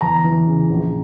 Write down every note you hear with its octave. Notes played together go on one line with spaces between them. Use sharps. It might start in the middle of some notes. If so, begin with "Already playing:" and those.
E2 A#5
E3
C#3
A#1